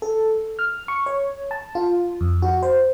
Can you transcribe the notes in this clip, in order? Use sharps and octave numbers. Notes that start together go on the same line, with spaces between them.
A4
F6
C#6
C#5
A5
F4
F2
F#4
C5